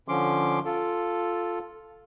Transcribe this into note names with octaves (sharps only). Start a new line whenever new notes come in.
D3 F3 C#4 C6 D6
F4 A4